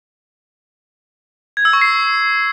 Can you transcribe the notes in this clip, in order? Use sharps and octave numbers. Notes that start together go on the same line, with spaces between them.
G#6
E6
C#6
C7